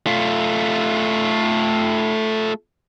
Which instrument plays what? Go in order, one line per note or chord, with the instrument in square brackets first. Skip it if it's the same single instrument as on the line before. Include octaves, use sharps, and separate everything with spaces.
[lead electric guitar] A3 F4